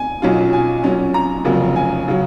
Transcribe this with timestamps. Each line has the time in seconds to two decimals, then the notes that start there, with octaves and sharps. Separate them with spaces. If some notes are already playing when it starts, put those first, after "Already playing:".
Already playing: G#5
0.22 B1 A#2 F#3 C#4 F4
0.53 G#5
0.84 A#2 F#3 C#4
1.14 A#5
1.45 F1 F2 C#3 F#3 A#3
1.76 G#5
2.08 C#3 F#3